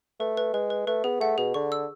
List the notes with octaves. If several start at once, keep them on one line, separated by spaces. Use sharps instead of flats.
A3 B4
B4
G#3 B4
B4
A3 B4
B3 G#4
A3 F#5
B2 G#4
D3 C#6
E6